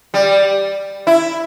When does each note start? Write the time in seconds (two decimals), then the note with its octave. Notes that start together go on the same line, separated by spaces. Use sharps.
0.14 G3
1.07 E4